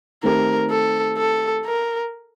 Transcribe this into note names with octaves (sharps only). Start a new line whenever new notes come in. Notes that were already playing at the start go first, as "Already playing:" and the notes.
D#3 A3 C4 G4 A#4
A4
A4
A#4